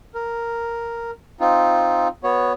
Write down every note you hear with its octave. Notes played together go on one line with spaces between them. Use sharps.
A#4
C4 D#4 F4
B3 F#4 C#5